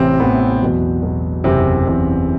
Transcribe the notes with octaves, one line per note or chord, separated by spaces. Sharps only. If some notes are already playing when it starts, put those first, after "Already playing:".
Already playing: A1 A2 C3 E3 C4
A1 A2 E3 B3
E2 B2 F#3
E2 B2 F#3
F#1 E2 C3 E3 C4
F#1 E2 C3 E3